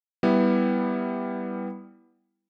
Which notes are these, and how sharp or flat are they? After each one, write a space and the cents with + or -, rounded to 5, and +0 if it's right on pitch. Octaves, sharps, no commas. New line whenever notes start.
G3 +0 B3 +0 E4 -5